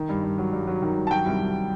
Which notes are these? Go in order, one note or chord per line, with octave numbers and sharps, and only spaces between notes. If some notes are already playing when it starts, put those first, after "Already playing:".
Already playing: D#3
G2
G2
F#3
G2
F#3
D#3
G2
A5
F#3 G5
C2
C2